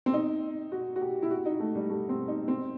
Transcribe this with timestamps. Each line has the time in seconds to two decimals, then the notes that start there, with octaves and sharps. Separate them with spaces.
0.06 C4
0.14 D#4
0.72 F#4
0.96 F#4
1.01 G4
1.22 E4
1.31 F#4
1.46 D#4
1.60 A3
1.75 G3
1.89 A3
2.09 C4
2.28 D#4
2.48 C4